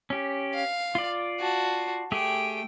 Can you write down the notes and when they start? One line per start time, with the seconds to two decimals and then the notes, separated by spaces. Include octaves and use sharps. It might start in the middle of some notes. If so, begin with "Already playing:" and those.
0.10 C#4 G4
0.54 F5
0.95 F4 D5
1.40 F#4 A5
2.12 A3 G4 G#4 G5